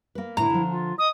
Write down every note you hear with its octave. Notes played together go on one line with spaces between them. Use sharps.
A#3 B4
A2 D3 E4 A#5
D3 F3
F4
D#5 D#6